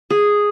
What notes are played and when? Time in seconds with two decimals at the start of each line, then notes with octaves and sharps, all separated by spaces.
0.10 G#4